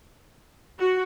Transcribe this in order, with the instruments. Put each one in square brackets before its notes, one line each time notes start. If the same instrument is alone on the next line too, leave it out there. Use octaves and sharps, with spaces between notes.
[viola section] F#4